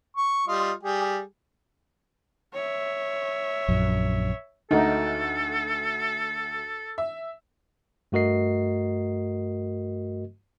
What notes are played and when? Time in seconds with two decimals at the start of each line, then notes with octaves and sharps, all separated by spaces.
0.17 C#6
0.47 G3 F4 D#5
0.83 G3 G4 G#4
2.54 C#5 E5
3.68 A#1 F#2
4.71 D2 A3 D#4 F#4 A4
6.98 E5
8.12 G2 A3 F#4 A#4 D#5 C7